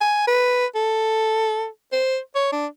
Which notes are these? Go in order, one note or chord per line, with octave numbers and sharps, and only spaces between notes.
G#5
B4
A4
C5
C#5
D4